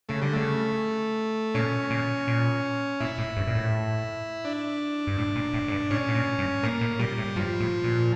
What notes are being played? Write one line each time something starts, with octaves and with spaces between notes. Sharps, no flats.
C#3 A3
D3 G3
C#3 A3
A#2 C#4
A#2
A#2
A#2 E4
A2
G2
A#2
A2
D4
G2
A2
A#2
A2
A2
G2
A2 C#4
A2
A#2
G2
A2 A#3
A2
A#2 G3
A2
G2 F3
A2
A#2